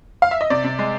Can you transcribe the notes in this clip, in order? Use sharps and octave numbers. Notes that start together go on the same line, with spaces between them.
F5
E5
D#5
C3 D5
C3
G#3